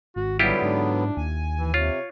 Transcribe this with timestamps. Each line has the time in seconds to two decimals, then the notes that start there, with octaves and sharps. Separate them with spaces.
0.16 G#1 F#4
0.39 D3 F#3 G3 B3 E4 F4 G4
0.62 G#2 D4
1.17 D#2 G#5
1.58 E3
1.74 C3 F4 C#5